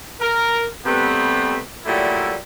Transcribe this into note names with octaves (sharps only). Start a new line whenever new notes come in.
A#4
C3 G3 A3 B3
A#2 F#3 G3 A3 E4